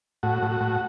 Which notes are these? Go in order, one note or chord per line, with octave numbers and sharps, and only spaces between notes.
A2 F#4
A2
F#4
A2